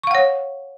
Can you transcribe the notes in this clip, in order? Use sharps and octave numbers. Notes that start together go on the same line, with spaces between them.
C#5 F5 F#5 C#6